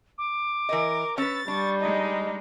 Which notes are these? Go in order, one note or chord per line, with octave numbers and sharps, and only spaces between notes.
D6
E3 A#4 D#5
C#4 B4 E6 A6
G3 D4 C#6
G#3 D#4 D#5